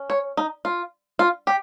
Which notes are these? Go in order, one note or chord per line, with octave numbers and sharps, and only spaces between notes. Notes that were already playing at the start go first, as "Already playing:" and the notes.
Already playing: C#4
C#5
D#4
F4
F4
G4